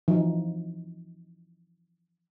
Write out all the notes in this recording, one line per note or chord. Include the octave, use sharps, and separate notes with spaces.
E3 F3 D#4